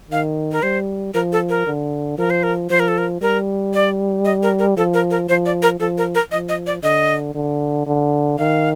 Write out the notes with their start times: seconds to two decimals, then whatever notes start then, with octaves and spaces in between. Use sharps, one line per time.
0.11 D#3 F5
0.52 A#4
0.63 G3 C5
1.14 F3 A#4
1.32 A4
1.49 A#4
1.66 D3
2.18 F3 A#4
2.30 C5
2.43 A#4
2.70 F3 C5
2.80 A#4
2.88 A4
2.98 A#4
3.21 G3 A#4
3.74 D5
4.25 D#5
4.43 A#4
4.59 A#4
4.77 F3 A4
4.94 A#4
5.11 A#4
5.29 F3 C5
5.46 D5
5.62 A#4
5.80 F3 A4
5.98 A#4
6.15 A#4
6.31 F3 D#5
6.49 D#5
6.67 D5
6.83 D3 D#5
7.35 D3
7.87 D3
8.38 D#3 F5